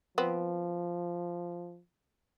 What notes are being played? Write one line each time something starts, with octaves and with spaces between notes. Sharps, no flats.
F3 B3 C4